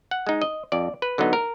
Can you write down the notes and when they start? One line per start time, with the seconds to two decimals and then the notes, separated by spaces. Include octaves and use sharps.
0.11 F#5
0.27 G#3 D#4
0.42 D#5
0.72 F2 D5
1.02 B4
1.18 D3 F#3 B3 D#4
1.33 A#4